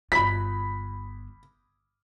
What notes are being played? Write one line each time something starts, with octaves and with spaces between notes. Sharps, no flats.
G1 F4 B5 B6